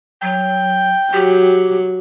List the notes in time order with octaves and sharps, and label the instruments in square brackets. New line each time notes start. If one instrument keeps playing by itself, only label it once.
[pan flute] F#3 [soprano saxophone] G5
[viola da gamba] F#3 [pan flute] G4